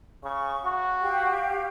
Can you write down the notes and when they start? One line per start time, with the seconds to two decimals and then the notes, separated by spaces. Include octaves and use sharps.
0.23 C#3 C#6
0.64 F#4
1.02 G4 F5 G5